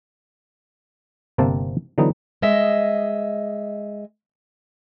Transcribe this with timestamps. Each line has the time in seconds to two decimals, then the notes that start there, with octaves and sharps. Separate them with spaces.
1.38 G1 C3 A#3 C4 A5
1.98 D3 E3 F#3 B3 D#4
2.42 G#3 D#5 E5